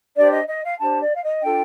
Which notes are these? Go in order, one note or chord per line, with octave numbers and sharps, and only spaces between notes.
D4 G4 C5 D5
D#5
D#5
F5
D4 G4 C5 A5
D5
F5
D#5
D4 F4 A4 G5